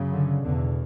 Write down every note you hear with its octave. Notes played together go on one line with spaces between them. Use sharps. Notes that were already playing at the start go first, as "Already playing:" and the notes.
Already playing: F#2 C#3
D3
E2 B2 D3